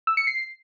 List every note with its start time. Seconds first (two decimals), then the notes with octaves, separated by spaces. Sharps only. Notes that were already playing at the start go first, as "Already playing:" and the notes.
0.07 E6
0.17 C#7
0.27 C7